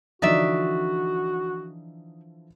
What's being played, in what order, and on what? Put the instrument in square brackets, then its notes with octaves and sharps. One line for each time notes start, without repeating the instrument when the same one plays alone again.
[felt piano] D3 E3 F3 [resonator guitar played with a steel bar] D#4 D5 E5 [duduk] F#4